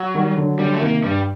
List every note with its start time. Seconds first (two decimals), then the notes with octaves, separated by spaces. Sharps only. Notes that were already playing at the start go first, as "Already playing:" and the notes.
Already playing: F#3
0.14 D#3 G3
0.37 D3 F#3
0.59 D3 F#3 G3
0.74 A3
0.81 C3 D#3 A#3
1.03 G2 G3